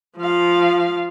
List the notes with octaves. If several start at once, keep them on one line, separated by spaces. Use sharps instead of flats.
F3 F5